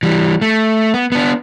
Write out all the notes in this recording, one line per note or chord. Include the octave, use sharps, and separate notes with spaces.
E3 G3
A3
B3
B3 D4